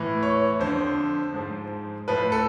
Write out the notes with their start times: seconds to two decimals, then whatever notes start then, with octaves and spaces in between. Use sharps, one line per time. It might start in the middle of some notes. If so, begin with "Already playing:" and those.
Already playing: A2 E3
0.23 C#5
0.59 F2 D3 F3 C5
1.34 G#2 F3
2.08 A2 F3 B4
2.32 A4